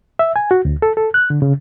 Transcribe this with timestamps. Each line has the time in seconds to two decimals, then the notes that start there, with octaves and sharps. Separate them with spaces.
0.19 E5
0.36 G#5
0.51 F#4
0.65 D2
0.82 A4
0.97 A4
1.14 F#6
1.30 D3
1.42 C#3